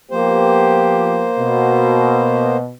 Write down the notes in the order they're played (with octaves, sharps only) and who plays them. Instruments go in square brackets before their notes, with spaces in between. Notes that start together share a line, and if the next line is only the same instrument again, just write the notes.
[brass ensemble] F3 B3 G4 [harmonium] A#3 C5
[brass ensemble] B2